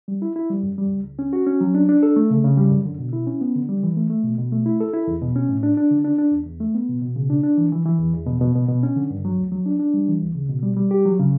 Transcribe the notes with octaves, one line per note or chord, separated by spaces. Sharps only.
G3
E4
E4
G3
F#2
G3
C#2
C#2
C#4
F#4
C#4
F#3
D4
D4
A4
A3
C#3
C#3
G3
F#2
D3
B2
E4
C#4
B3
D3
G3
E3
A3
A3
B2
B2
A3
E4
A4
E4
E2
B2
C#4
A2
D4
D4
D3
D4
D4
E2
E2
A3
B3
B2
B2
C#3
D4
D4
E3
E3
E3
E2
E2
B2
B2
B2
B2
C#4
D3
G2
F#3
D2
F#3
D4
D4
G3
E3
D2
C#3
B2
G3
G3
G4
F#3
C#3